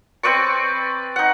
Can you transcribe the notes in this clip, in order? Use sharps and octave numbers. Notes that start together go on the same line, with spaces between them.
C4 B4 D5 C#6
D#4 F#5